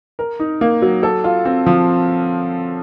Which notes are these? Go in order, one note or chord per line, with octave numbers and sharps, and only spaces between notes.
A#4
D#4
A#3
F#3
A4
F4
C4
F3